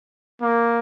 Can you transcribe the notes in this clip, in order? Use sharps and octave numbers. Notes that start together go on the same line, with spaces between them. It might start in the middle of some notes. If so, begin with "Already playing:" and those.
A#3